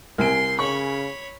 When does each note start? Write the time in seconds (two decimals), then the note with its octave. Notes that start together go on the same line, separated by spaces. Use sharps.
0.18 C2 A#4 G#5 C6 D7
0.59 C#3 C#5 B5 C#6